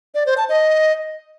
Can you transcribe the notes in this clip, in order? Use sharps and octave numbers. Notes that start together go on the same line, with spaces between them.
D5
C5
A5
D#5